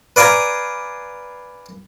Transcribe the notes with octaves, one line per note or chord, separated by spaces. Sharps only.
B4 D5 F5 G#5 A#5